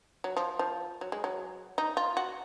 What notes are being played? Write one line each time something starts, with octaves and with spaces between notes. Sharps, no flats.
F#3
F3
F3
F#3
G#3
F#3
D#4
F4
F#4